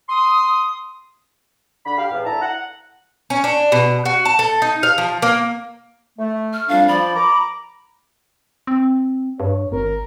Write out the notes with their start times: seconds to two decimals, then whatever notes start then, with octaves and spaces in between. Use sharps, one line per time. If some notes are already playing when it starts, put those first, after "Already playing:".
0.09 C6 D#6
1.86 D3 B5
1.98 G4 F5
2.12 E2 A2
2.25 D2 E4 A5 A#5
2.41 F#5
3.30 C#4
3.44 D4
3.72 B2
4.05 F#4
4.25 A5
4.39 A4
4.62 D#4
4.83 F5
4.98 F3
5.22 A#3
6.18 A3
6.53 F6
6.69 F2 G3 D4 F5
6.88 F3 D5 B5
7.14 A#5 D6
8.67 C4
9.40 G2 C#5
9.72 G#1 A#4